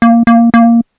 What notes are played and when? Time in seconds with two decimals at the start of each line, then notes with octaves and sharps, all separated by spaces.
0.02 A#3
0.27 A#3
0.54 A#3